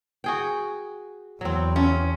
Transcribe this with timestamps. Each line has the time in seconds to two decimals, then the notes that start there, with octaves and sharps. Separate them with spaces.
0.24 F#4 G#4 G5
1.41 E2 F#3 C4
1.76 C#4 F4